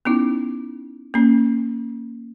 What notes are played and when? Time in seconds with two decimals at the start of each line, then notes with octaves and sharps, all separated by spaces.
0.05 B3 C#4 D#4 E4
1.14 A#3 C#4